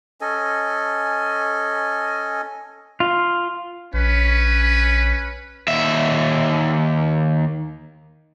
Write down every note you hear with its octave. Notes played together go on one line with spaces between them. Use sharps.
C#4 A4 D#5 G#5
F4
A#1 C#4 B4
D#2 E5